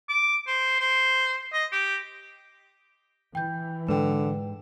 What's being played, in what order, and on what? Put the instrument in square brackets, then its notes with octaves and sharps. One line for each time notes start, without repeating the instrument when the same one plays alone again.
[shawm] D6
C5
C5
D#5
G4
[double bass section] E3 [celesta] G5 G6
[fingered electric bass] G#2 G#3 [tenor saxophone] D3 [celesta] B4 G5